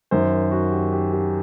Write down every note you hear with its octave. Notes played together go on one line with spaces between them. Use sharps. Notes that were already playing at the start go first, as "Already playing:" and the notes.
F#2 D#3 C5
F#4
G4
G4
G4